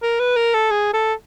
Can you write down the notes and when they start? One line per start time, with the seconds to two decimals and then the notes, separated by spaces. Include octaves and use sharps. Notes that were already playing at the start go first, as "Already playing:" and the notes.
0.03 A#4
0.20 B4
0.36 A#4
0.54 A4
0.71 G#4
0.93 A4